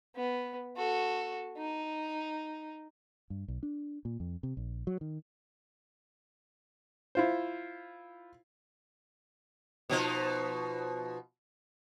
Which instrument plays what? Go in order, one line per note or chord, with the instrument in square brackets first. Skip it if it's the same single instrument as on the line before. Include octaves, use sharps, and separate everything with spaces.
[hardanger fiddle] B3
F#4 A4
D#4
[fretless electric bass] G2
B1
D4
A#2
F2
C3
A#1
F#3
D#3
[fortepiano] E4 F4 C5
[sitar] B2 F3 D#4